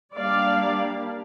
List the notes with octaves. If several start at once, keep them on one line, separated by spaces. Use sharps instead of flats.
G3 A#3 D4 D5 F5